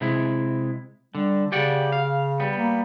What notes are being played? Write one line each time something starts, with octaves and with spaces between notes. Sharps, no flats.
C3 G#3 E4
D3 G3
C#3 G4 D5 F#5
F5
G3 B3
A#3